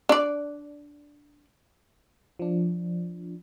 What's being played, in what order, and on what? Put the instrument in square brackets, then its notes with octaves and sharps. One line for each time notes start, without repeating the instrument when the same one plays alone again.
[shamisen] D4 D5
[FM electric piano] F3 D4